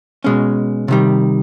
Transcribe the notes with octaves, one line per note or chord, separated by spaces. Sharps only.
B2 G#3 C#4
C3 D#3 G3